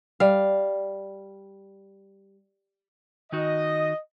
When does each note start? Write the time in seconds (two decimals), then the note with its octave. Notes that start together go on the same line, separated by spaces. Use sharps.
0.20 G3 F5
3.32 D#3 D#4 F#4 D#5